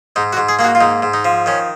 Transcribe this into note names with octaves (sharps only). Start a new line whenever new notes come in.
G#2 D#4
F#4
G#2
G#4
A#3 G#4
F#4
F4
G#2 D#4
G#2
D#4
F3
D#3 C#4